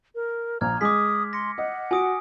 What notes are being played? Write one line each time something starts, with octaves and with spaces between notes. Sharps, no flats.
A#4
A#1 A#5 F6 G#6
G#3 D6 D#6 B6
C6 A#6 C#7
D#5 F#5
F#4 G#5 D#6 D7